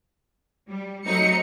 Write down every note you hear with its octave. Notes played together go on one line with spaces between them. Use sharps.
G3
F#3 A3 C4 D#4 C#7